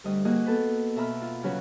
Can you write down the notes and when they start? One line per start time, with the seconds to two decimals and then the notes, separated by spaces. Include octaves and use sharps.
0.04 D2 G3 D#5
0.25 A#3 F#4 G#4 D#5
0.46 B3 A4 B4
0.96 B2 E5 A#5 B5 F6
1.22 F4
1.43 C#3 F#3 C#4 F#4 B4